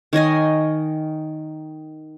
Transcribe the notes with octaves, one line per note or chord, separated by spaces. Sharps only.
D#3 C#5 D#5 G#5